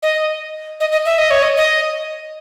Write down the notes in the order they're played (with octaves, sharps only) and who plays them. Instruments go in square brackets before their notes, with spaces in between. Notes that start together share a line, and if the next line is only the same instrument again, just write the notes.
[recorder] D#5
D#5
D#5
E5
D#5
C#5
D#5
D#5